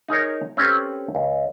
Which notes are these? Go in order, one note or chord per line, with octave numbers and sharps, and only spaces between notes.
D#4 G#4 A#4 C#5
C4 C#4 G4 A4 B4
C#2